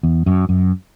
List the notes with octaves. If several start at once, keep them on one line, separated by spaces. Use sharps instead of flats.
E2
F#2
F#2